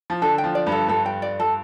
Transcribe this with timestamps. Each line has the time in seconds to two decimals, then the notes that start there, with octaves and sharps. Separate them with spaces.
0.10 F3
0.22 D3 A4
0.38 G5
0.44 F3
0.55 D5
0.67 G2
0.72 A4
0.88 G2 A4
1.06 G5
1.22 D5
1.40 A4